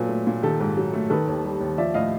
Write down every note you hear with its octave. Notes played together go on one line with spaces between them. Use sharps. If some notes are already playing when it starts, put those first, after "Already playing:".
Already playing: A#2 F#3 A4 B4
A3
A#2
D#3 G4 A4
G#2
F#3
A3
D#3 A4 B4
D#2
G3
D#2
F3 D5 E5
A2 D#5 F5